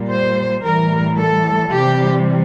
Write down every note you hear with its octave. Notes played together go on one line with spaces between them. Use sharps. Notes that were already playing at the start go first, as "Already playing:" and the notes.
Already playing: A#2 G3
C5
A2 E3 G3 A#4
A4
C3 E3 G3 G4